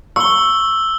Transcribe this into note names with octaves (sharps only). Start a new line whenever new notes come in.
C#6 E6 G7